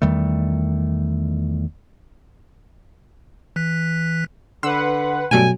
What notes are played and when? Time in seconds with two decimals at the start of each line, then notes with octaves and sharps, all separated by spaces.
0.02 E2 D#3 G3 A3
3.56 E3 F#6 B6
4.63 D3 B4 F#5 C6 E6
5.31 G2 B2 F#3 A3 G#5 D7